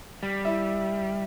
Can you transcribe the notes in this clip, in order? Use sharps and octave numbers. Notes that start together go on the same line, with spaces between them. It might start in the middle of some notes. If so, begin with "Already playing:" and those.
G3
E4 E5